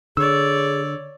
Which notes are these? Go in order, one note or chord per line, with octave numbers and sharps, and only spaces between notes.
D3 G#4 C#5 D5 E6